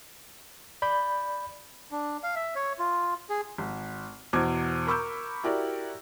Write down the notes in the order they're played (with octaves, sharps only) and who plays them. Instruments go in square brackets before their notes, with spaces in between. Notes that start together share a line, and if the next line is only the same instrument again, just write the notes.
[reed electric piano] D5 B5 G6
[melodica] D4
F5
E5
C#5
F4
G#4
[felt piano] G#1
E2 B2 C5 D6 G#6
A#4 B5 C#6 D6 E6 G6
E4 F#4 G4 A#4 D5